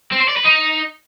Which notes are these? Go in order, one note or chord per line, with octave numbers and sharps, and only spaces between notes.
C4
C5
D5
B4
D#4